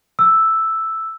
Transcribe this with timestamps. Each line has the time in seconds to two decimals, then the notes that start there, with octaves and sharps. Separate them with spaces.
0.19 E6